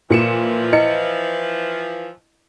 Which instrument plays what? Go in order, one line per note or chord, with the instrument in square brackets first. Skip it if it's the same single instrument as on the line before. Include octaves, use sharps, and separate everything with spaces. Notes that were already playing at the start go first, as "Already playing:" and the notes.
[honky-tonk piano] A#2 C#7 E7 [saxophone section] E3 F3
[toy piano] E4 B4 D#5 [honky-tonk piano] C#7